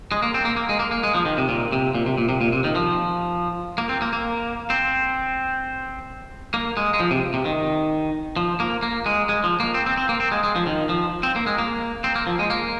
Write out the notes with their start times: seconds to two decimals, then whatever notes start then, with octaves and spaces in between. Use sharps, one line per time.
0.12 G#3
0.23 A#3
0.34 C4
0.45 A#3
0.57 A#3
0.69 G#3
0.79 A#3
0.92 A#3
1.04 G#3
1.15 F3
1.26 D#3
1.38 C3
1.49 A#2
1.72 C3
1.95 A#2
2.06 C3
2.18 A#2
2.29 C3
2.41 A#2
2.52 C3
2.64 D#3
2.75 F3
3.78 A#3
3.89 C4
4.02 A#3
4.13 A#3
4.70 C4
6.54 A#3
6.77 G#3
6.94 G#3
7.00 F3
7.11 C3
7.34 C3
7.45 D#3
8.37 F3
8.60 A#3
8.83 A#3
9.06 G#3
9.29 G#3
9.44 F3
9.60 A#3
9.74 C4
9.86 C4
9.97 C4
10.09 A#3
10.20 C4
10.32 G#3
10.44 G#3
10.56 F3
10.67 D#3
10.89 F3
11.23 C4
11.36 A#3
11.47 G#3
11.59 A#3
12.04 C4
12.16 A#3
12.27 F3
12.39 G#3
12.50 A#3